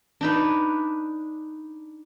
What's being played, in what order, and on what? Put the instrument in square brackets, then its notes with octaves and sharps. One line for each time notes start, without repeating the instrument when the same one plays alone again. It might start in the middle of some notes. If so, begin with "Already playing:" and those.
[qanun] D4 D#4 B4